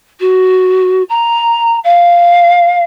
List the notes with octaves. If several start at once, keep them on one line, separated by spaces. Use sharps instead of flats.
F#4
A#5
F5